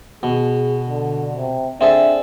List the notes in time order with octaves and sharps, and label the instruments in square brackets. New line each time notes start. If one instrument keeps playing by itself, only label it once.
[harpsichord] B2 [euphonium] G#4
[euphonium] D3
C3
[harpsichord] C4 G#4 A4 [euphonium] D4 [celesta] E5